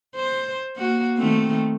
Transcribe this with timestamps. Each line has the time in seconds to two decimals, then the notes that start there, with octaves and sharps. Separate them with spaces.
0.15 C5
0.77 A#3 F#4
1.17 D#3 A3 C4